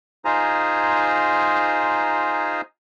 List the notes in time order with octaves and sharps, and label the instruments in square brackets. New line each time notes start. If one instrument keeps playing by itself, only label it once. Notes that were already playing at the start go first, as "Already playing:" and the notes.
[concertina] D#4 F4 G#4 C5 G#5 A#5